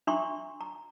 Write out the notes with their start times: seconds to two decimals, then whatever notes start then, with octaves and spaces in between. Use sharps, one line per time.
0.07 D4 E5 A#5 C6 C#6
0.61 A#5